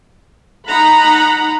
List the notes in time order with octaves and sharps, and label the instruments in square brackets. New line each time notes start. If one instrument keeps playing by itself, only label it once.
[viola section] D#4 F#5 A#5 B5